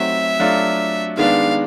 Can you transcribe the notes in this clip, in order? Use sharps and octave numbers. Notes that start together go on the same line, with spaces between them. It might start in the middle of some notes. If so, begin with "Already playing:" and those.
Already playing: F#3 A3 C4 D#4 F#4 E5
F#3 A3 D4 F4
D#3 G#3 B3 D4 F5